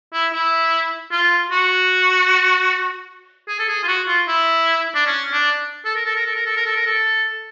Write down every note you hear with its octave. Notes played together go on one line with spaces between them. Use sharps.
E4
E4
F4
F#4
G#4
A4
G#4
F4
F#4
F4
E4
D4
C#4
D4
A4
A#4
A4
A#4
A4
A#4
A4
A#4
A4
A#4
A4